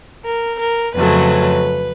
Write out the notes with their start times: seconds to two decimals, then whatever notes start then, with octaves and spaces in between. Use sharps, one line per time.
0.24 A#4
0.60 A#4
0.95 F2 C#3 F#3 A3 B4